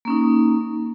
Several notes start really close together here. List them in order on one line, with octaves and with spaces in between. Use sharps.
A#3 C#4 D#4